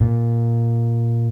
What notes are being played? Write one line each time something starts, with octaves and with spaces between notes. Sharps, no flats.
A#2